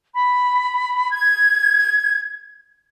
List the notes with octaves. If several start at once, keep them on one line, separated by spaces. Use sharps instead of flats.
B5
G#6